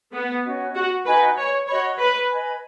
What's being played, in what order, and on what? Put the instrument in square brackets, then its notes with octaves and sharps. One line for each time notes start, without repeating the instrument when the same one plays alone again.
[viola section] B3
[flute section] C#4 F#4 D#5
[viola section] F#4
[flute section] D#4 F#4 D#5 G#5 [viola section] B4
[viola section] C#5
[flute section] F#4 D#5 B5 [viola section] C#5
[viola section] B4
[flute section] B4 D#5 G#5 B5